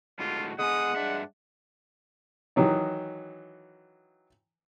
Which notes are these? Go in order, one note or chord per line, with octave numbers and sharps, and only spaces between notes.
A2 D3 G#3 F4 F#4
D3 G#3 B3 F#5 G#5 D#6
G2 D4 E5
D#3 E3 F#3 D#4